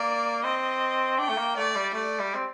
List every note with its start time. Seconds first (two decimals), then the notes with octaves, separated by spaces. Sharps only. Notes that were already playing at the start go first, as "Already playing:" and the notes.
Already playing: A#3 D5
0.44 C4 D#5
1.19 D4 G5
1.30 A3
1.38 A#3
1.57 A3 D5
1.76 G3
1.94 A3 D5
2.19 G3
2.35 C4